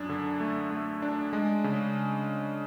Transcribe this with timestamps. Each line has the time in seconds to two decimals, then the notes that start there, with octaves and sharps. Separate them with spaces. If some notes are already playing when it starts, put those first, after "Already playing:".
Already playing: F#2 D4
0.09 D3
0.40 A3
0.71 A3
1.02 D4
1.33 G#3
1.64 C#3